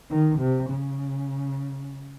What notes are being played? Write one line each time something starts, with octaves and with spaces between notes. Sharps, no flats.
D#3
C3
C#3